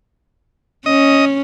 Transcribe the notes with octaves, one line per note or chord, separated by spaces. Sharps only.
C#4 D#5